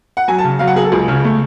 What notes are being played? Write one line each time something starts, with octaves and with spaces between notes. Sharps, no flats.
F#5
F#3 G#5
A5
C#3
F#3 F5
F#5
F#3 G#4
A4
C#2 G#4
C#3
A3